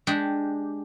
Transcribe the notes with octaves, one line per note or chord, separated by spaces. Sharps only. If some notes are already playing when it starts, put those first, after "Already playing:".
G#3 D4 G4